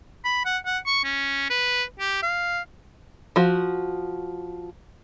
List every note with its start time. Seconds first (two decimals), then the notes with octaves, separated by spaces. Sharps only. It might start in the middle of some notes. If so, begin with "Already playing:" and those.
0.25 B5
0.45 F#5
0.66 F#5
0.86 C#6
1.04 C#4
1.50 B4
1.99 G4
2.23 F5
3.36 F3 F#4